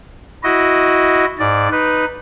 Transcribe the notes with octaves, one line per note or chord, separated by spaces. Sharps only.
E4 F#4 D#5
G#2 D5
D#4 B4